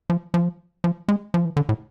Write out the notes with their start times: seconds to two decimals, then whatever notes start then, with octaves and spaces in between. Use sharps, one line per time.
0.10 F3
0.34 F3
0.84 F3
1.08 G#3
1.34 F3
1.45 E3
1.57 D3
1.69 A2